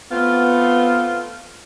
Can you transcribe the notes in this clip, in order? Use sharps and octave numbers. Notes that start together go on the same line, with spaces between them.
A3 B3 C4 F4